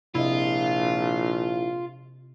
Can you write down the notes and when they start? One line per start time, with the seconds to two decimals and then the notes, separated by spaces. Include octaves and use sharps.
0.15 A#1 C3 E4 F4 D#5